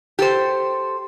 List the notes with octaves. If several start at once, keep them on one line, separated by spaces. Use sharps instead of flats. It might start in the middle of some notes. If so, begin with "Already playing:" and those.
G4 A4 C5